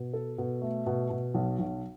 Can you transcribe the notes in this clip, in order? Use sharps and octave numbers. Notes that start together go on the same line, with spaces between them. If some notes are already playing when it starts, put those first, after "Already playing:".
Already playing: B2
A4
B2
A3
B2
B2
B1
B1